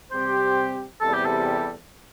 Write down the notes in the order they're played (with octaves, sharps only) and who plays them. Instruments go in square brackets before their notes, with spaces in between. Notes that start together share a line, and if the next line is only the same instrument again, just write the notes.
[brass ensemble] C3 G3 C4 G4 [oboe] C5
[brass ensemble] E2 C3 G3 [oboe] A4
[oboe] G4
A4